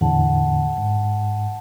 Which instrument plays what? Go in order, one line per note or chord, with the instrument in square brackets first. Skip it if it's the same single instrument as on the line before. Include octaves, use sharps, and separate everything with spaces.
[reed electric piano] E2 A2 D3 [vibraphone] F#5 A5
[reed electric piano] G#2